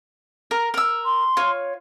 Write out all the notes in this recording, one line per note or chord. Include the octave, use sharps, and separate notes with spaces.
A#4
A#4 E6
C6
F4 C#5